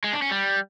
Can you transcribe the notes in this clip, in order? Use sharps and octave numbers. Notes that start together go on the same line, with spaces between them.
G#3
D4
C#4
G3